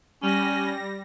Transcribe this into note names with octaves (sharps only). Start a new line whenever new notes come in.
G3 C#4 A#6